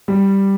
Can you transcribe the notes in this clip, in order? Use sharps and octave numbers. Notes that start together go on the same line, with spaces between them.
G3